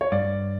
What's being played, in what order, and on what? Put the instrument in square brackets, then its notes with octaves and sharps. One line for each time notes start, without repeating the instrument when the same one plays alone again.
[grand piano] C#5
[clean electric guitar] G2 [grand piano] D5